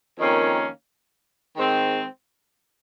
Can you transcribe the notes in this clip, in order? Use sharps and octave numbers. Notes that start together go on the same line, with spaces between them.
F2 D#3 A#3 C#4
D#3 G#3 C4